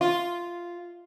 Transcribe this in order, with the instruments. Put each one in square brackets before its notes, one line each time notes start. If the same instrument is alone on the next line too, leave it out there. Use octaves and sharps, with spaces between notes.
[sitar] F4